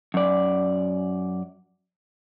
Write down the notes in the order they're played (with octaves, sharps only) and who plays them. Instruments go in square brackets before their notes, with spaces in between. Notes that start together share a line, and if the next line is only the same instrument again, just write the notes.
[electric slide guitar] F#2 D5